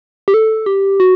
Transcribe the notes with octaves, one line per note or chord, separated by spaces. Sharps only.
G4
A4
G4
F#4